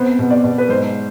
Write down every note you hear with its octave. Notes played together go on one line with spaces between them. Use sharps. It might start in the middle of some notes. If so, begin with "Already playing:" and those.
Already playing: C3 B3 C5
B2
D5
B2
B4
G#2 C5